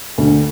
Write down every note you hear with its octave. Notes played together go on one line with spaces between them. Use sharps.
D2